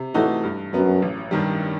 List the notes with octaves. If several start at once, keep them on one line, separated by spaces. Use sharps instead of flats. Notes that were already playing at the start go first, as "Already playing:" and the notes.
Already playing: C3
A2 E3 A3 D#4 F#4
G2
F#2 F#3 B3
A1
G2 D#3 G3